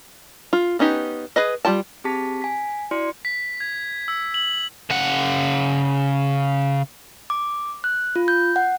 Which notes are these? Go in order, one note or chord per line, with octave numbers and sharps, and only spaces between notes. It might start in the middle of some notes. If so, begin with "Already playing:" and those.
F4
B3 C#4 D#4 G4
G#4 B4 D#5
G3 F4 G5 A5
C4 G4 G#4 A5 B6
G#5 B6
E4 F#4 D5 C6 C#7
B6
G#6
E6
F#7
C#3 F#5
D6
F#6
F4
G6
F#5